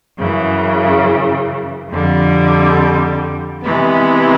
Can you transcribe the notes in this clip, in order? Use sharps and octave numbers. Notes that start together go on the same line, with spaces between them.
F#2 C#3 E3
F2 D3 G3
C3 E3 G#3 B3